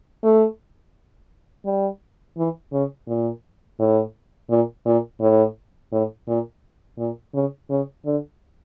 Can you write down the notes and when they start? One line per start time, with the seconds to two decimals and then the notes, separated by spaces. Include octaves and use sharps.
0.24 A3
1.66 G3
2.37 E3
2.72 C#3
3.07 A#2
3.79 A2
4.50 A#2
4.86 A#2
5.21 A2
5.92 A2
6.28 A#2
6.98 A#2
7.34 C#3
7.70 C#3
8.06 D3